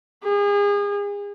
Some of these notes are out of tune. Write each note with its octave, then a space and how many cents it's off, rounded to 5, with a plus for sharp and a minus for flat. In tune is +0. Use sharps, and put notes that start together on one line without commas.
G#4 -35